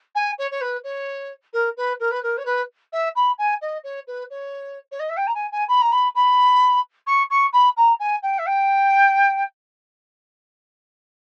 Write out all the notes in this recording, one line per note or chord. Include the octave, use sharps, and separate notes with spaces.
G#5
C#5
C#5
B4
C#5
A#4
B4
A#4
B4
A#4
C#5
B4
E5
B5
G#5
D#5
C#5
B4
C#5
C#5
D#5
E5
G5
A#5
G#5
G#5
B5
A#5
B5
B5
C#6
C#6
B5
A#5
G#5
G5
E5
G5